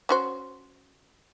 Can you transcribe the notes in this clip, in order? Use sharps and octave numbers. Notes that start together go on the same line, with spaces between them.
C#4 F#4 C5